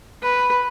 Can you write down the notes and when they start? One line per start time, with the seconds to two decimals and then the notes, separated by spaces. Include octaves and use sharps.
0.22 B4